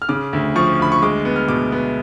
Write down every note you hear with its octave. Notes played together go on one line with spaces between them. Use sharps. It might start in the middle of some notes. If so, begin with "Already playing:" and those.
F6
C#3 D6
D2
F3 C#6
D2 B5
C#6
G#3 D6
B3
F6
B2 D6
B3